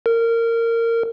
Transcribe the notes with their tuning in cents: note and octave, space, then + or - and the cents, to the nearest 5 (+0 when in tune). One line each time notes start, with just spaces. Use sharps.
A#4 -20